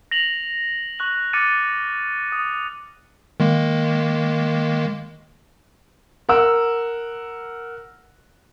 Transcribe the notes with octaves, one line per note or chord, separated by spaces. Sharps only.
A#6 F7 F#7
C#6 F#6 F#7
D6 F6 A6 C#7 D#7
D#6
D#3 G#3 A#3
A#4 F#5 E6